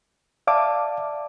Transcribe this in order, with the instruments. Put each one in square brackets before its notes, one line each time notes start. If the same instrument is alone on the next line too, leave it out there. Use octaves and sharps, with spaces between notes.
[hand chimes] D5 A5 [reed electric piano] E5 F5 D6